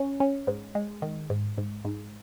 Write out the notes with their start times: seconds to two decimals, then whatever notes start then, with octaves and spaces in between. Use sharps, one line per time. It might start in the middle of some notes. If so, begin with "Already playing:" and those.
Already playing: C#4
0.20 C#4
0.47 G#2
0.75 G#3
1.02 D#3
1.30 G#2
1.58 G#2
1.85 G#2